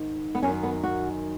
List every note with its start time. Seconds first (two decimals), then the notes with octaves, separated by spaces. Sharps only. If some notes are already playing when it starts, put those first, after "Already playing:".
Already playing: G#2 D#3
0.35 B3
0.43 F#2 D#3 C#4
0.63 B3
0.83 F#4